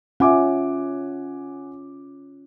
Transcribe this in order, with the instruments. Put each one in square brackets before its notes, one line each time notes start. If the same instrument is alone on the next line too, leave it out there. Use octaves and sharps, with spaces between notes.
[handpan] C#4 [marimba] F4 E5 [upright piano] F#5 G#5 D6